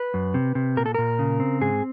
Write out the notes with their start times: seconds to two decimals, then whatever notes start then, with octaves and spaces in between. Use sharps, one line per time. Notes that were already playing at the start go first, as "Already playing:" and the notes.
Already playing: B4
0.14 F#2
0.34 C3
0.55 C3
0.77 A#2 A#4
0.86 A4
0.95 A#2 A#4
1.19 C#3
1.40 C4
1.61 G#2 G#4